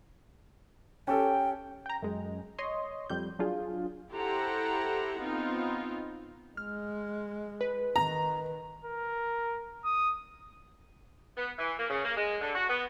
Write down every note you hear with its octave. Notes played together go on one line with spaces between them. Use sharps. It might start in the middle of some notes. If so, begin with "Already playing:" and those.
C#4 G4 A4 G5
G5 A#5
F#2 G#3
C#5 D#5 C6
F2 G3 G6
F#3 D4 F4 G#4
E4 G4 A4 C5 F#5 A#5
B3 C4 D#4 F4
G#3 F6
B4
D#3 A#5
A#4
D#6
B3
E3
A#3
C#3
A#3
G#3
D3
F#4
B3